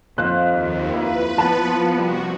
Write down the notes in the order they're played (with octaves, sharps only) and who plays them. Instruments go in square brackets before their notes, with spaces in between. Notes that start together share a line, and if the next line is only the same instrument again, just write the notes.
[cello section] F2 [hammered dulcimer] C5 D#5 F5 [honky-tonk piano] F#6
[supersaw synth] D#2
[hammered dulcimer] A#3 E4 [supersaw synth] B4
[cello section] F3 B3 [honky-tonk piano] A5 [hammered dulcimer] D6
[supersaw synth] C3 F#4 [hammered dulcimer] G3